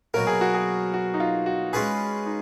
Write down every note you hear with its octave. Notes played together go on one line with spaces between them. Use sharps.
B2 F#3 A#3 A#4
G#4
F#4
G#4
F#4
D#4
F4
F#4
G#3 C#4 F4 G#4 B4
D#4